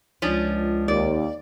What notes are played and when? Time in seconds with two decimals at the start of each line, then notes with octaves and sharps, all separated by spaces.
0.22 C#2 F3 C#4 D4
0.88 D#2 D5